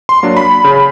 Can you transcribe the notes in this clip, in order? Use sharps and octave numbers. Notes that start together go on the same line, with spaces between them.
C6
F#3 A#3 D4
B5
C#3